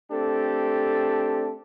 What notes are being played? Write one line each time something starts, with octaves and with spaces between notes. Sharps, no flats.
A3 C4 D4 G4 A4